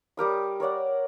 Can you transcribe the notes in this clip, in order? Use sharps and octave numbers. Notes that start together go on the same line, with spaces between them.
G3 G4 A#4 D#6
A#4 C#5 D5 F#5